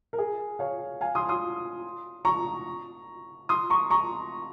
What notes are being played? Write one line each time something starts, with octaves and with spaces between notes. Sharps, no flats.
A#4
G#4
C#5 F5
F5 G#5
C6 D#6
C6 D#6
A#5 C#6
C6 D#6
A#5 C#6
A#5 C#6